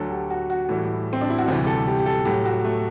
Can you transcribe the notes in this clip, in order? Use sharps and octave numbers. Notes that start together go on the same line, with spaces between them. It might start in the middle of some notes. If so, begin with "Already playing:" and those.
Already playing: D2 D3 F#3 A4
G4
F#4
F#4
A2 E3 G3
C4
D4
E4
F#4
D2 C3 E3 G3 G4
A4
G4
G4
A4
A2 F#3 G4
F#4
A3